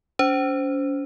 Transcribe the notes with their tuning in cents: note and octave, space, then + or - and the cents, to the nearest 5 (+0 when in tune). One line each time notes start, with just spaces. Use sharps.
C#4 +40 C5 -5